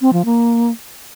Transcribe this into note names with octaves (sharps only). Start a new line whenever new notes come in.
C4
F3
A#3